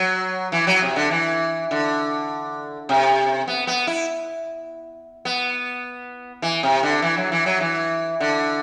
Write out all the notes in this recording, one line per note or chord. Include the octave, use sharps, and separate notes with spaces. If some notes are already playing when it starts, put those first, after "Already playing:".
Already playing: F#3
E3
F#3
C3
D3
E3
D3
C3
B3
B3
E4
B3
E3
C3
D3
E3
F#3
E3
F#3
E3
D3